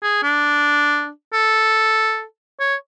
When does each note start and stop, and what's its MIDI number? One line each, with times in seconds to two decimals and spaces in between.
0.02 0.21 68
0.23 1.09 62
1.33 2.23 69
2.60 2.75 73